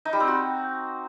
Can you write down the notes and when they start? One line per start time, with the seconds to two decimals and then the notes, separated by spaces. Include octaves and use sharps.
0.05 D#4
0.13 G3
0.20 C4
0.28 F#4